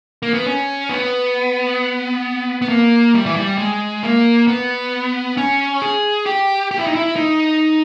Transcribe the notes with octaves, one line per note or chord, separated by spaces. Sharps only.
A#3
B3
C#4
B3
B3
A#3
G3
E3
G3
G#3
A#3
B3
C#4
G#4
G4
G4
E4
D#4
E4
D#4